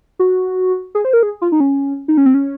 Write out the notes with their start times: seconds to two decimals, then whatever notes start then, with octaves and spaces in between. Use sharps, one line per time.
0.19 F#4
0.95 G#4
1.05 C5
1.13 A#4
1.23 G#4
1.42 F4
1.52 D#4
1.60 C#4
2.08 D#4
2.17 C#4
2.26 C4
2.34 C#4